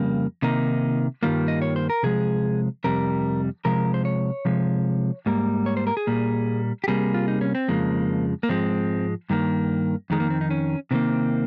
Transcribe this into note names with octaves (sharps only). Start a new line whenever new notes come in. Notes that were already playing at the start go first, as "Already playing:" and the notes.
Already playing: F2 C#3 G3 A#3
C3 D#3 A#3 D#4
G2 D#3 G3 A#3 F4
D#5
C#5
C5
A#4
C3 F3 G#3 G#4
F2 C3 G3 A#4
C3 F3 G#3 A#4
C5
C#5
C3 F3 G#3
G#2 G3 A#3
C#5
C5
A#4
G#4
A#2 G3 A#3
G4
C3 G3 A#3 G#4
F4
D#4
C#4
C4
F2 C#3 F3 G#3 A#3
A#3
G#2 F3 G#3 C4
G2 D#3 A#3
F2 D#3 G#3
A#3
C4
D#4
C#4
C3 D#3 G3 A#3 C4